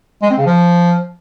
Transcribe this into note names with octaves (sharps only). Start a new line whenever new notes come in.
G#3
C4
C#3
F3